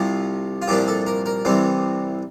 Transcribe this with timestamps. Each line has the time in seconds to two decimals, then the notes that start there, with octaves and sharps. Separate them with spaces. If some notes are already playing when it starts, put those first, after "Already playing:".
Already playing: C2 C3 F3
0.62 F4
0.68 C2 A#2 F3 A#3 D4 G4
0.88 A4
1.06 A#4
1.26 A#4
1.45 C2 C3 E3 G3 C4